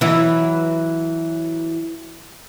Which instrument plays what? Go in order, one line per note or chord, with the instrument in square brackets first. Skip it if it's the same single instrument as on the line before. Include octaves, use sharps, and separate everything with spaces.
[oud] E3 F#3 E4